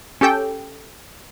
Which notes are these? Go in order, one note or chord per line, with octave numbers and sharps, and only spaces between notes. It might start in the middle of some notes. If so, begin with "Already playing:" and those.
C#4 G4 A4 G5